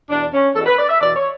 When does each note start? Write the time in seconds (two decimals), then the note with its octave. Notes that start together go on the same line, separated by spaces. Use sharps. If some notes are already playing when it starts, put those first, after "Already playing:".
0.09 E2 B2 D4
0.32 C#4
0.55 E2 A4
0.59 B2
0.66 B4
0.78 D5
0.89 E5
1.01 E2 B2 D5
1.16 C#5